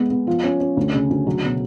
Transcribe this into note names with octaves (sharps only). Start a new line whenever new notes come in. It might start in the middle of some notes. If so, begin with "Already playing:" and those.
Already playing: G#3 B3
B3
F3
C#4
C#4
D2
C#3
D2
F#3
B2